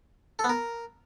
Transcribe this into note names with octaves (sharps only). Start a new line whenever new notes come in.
A4
B3
A#4